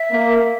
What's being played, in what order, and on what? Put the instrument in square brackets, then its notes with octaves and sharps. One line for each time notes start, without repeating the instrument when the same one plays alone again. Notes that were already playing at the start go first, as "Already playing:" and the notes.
Already playing: [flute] E5
[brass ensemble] A#3